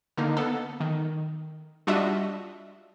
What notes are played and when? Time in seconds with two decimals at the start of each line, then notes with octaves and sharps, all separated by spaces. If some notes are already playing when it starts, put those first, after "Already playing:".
0.17 D3 A#3 D#4
0.37 B3 A4
0.80 D#3
1.87 G3 D4 F4 F#4 D#5 E5